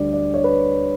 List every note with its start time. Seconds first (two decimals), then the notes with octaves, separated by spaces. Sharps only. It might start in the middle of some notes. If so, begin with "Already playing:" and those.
Already playing: D2 D3 G3 D5
0.13 D5
0.34 C#5
0.44 B4